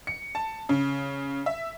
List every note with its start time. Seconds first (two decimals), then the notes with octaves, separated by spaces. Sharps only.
0.07 C#7
0.35 A5
0.69 C#3
1.46 E5